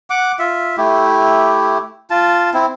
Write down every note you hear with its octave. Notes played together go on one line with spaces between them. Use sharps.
F#5 D6
F4 E5
A3 E4 G4
F4 A5
C4 E4